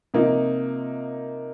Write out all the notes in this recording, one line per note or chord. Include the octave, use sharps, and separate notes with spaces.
C3 F3 A#3 D#4